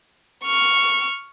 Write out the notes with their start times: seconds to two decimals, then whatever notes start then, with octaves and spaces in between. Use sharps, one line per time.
0.44 C#6 F6